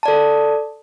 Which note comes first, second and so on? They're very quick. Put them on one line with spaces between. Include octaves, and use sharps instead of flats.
A5 D5 A4